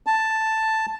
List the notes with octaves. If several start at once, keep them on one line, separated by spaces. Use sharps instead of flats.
A5